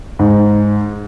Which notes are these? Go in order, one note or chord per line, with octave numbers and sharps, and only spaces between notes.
G#2